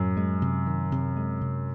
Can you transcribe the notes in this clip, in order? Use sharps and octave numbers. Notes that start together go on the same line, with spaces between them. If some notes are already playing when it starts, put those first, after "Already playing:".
Already playing: F#2 A2
G#3
C3
D#3
C3
G#3
C3